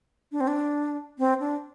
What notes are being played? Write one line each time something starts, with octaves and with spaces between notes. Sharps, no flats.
D4
C4
D4
C4
D4